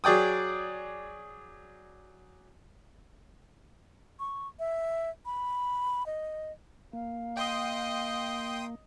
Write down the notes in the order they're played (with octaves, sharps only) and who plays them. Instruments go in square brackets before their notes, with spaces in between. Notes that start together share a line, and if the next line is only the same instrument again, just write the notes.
[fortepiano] F#3 G#4 D5 G5 D#6
[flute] C#6
E5
B5
D#5
[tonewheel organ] A#3 [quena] F5
[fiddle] D#5 [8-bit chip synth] G5 C6 D#6